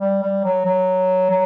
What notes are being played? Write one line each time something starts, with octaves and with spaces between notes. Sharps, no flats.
G3
G3
F#3
F#3
F#3